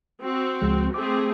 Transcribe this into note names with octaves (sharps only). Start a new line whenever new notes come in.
C4 F#4
C#2 F3 G#3
A3 C4 G#4 D6